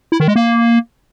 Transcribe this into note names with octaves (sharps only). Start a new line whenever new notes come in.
E4
D#3
G#3
A#3